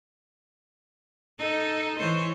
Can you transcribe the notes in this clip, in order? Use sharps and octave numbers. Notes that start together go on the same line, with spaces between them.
D#4 A4
E3 C5 C#5